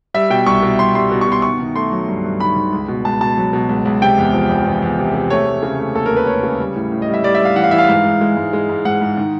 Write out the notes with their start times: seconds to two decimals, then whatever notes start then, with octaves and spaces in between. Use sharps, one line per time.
0.14 G3 E5
0.30 B2 G5
0.46 C2 C#6
0.62 B2
0.79 C2 C6
0.95 G3 C6
1.11 B2
1.21 C#6
1.27 B2 C6
1.42 D#3 C#6
1.59 D#3
1.75 A3 C6
1.92 F#3
2.08 G2
2.24 G2
2.40 D#3 B5
2.56 D#3
2.72 C#2
2.88 B2
3.05 C#2 A5
3.21 B2 A5
3.37 F#3
3.53 B2
3.69 C#2
3.85 C#2
4.02 C3 G5
4.18 E2
4.33 F3
4.49 E2
4.66 E2
4.82 E2
4.98 C3
5.14 C3
5.30 A3 C#5
5.47 A3
5.63 C#3
5.79 A3
5.95 D#2 A4
6.06 A#4
6.11 D#2
6.16 B4
6.27 A3 C#5
6.43 C#3
6.60 G3
6.75 A2
6.92 A2
7.02 D#5
7.08 G3
7.14 E5
7.24 G3 D5
7.35 E5
7.40 G3
7.45 F5
7.56 E3 F#5
7.64 F5
7.71 E3 E5
7.78 F5
7.89 G#2
8.05 G#2
8.21 G#3
8.37 G#2
8.53 G#3
8.69 G#2
8.85 G#2 F#5
9.01 G#2
9.17 D#3